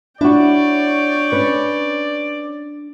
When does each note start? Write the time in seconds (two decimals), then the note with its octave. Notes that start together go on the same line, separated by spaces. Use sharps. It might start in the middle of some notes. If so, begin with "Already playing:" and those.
0.21 D4 E4 F#4 C#5 D5 G5
1.32 C#4 B4